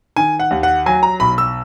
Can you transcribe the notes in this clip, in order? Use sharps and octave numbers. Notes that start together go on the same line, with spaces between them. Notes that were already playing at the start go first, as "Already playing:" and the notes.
D#3 G#5
F#5
D#2
F#5
F#3 G#5
A#5
B1 B5
E6